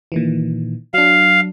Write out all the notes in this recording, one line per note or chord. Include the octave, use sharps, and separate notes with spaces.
A#2 D#3 E3
F#3 D4 F5